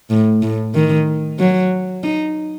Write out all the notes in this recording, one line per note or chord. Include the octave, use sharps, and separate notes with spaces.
A2
A2
D#3
F#3
D#4